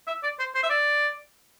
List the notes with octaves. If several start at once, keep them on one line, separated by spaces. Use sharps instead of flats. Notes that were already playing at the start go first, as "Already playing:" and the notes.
E5
D5
C5
C5
E5
D5